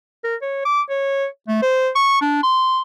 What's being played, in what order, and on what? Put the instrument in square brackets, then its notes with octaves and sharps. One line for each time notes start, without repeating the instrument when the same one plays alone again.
[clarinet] A#4
C#5
D6
C#5
A3
C5
C#6
D4
C6